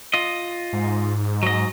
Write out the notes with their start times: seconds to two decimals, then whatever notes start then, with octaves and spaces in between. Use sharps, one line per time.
0.14 F4 D#5
0.73 G#2
1.43 F#3 D#5